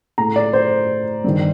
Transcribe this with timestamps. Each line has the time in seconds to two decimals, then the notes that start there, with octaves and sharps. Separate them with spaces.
0.18 A2 A#5
0.36 D5
0.53 C5
1.24 G2 D#3